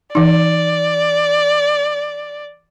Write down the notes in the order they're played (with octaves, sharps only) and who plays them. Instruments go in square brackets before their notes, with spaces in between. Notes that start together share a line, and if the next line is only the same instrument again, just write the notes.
[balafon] E3 D#4 [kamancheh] D5